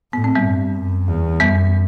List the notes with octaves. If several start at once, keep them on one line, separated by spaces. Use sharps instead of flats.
A2 B3
C4
G3 B3
G2
F#2
E2
F#2 G3 B3